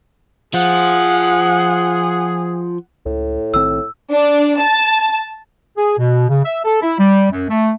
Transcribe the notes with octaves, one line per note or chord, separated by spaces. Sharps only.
F3 F4 G#4 F#5
C#2 A2
B1 D#3 C4 E6
D4
A5
G#4
B2
C#3
E5
A4
E4
G3
F#2
A3